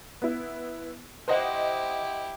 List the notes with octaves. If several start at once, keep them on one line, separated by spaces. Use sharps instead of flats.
B3 E4
E4 G4 C5 D#5 F#5